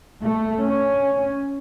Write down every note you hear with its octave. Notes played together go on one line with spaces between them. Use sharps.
A3
C#4